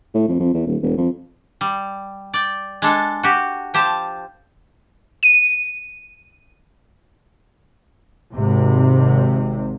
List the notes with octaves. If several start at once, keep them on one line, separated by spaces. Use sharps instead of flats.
A2
F2
F2
E2
D#1
E1
F2
G3
D5 G5
G#3 D4 A4
F#4 G4
F3 G4 C5 A5
D#7
G#1 C3